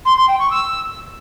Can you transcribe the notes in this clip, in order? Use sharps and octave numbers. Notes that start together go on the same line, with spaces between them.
C6
C6
G5
C#6
E6